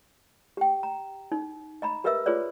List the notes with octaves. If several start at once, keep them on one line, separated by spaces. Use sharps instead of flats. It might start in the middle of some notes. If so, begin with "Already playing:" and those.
G4 G5
A#5
D#4
D#5 A#5 B5
G4 A#4 B4 D#5 E5 E6
F4 G#4 B4 C#5 D5